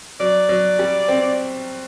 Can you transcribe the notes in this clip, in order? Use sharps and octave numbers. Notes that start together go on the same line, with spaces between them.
F#3 D5
F#3
G3
C4